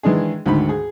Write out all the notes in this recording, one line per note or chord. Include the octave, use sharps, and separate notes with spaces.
D#3 E3 G#3 D4 G#4
D2 G#2 D#3 B5
G#4